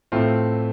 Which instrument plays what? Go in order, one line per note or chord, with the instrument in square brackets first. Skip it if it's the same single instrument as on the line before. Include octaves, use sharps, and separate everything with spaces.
[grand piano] A2 A3 C4 F4